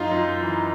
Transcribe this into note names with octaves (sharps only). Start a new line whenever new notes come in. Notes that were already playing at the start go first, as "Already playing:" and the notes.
Already playing: F#2 D#4 F4
F#2
E3